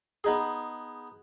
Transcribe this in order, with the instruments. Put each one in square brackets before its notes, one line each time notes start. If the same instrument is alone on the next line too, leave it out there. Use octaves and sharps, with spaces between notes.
[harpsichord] B3 D#4 G#4